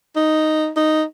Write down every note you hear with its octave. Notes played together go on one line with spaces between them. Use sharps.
D#4
D#4